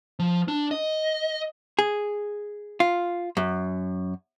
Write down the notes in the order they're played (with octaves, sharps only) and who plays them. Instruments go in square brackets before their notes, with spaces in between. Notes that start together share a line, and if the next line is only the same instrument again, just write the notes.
[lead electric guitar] F3
D4
D#5
[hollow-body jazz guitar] G#4
F4
F#2